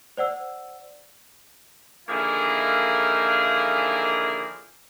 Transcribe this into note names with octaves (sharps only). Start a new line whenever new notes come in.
C5 D5 F#5 E6
D3 D#3 F3 A#3 E4 G#4